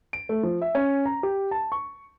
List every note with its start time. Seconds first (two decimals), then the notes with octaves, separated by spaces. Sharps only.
0.13 D7
0.29 A3
0.43 F3
0.62 E5
0.75 C#4
1.06 A#5
1.23 G4
1.51 A5
1.72 C#6